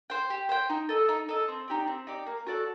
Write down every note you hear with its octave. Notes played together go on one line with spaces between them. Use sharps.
C5 G5
G4
C5 G5
D#4
A4 D#5
D#4
A4 D#5
C4
D#4 G4 D5
C4
D#4 G4 D5
A#3
F#4 A4 D5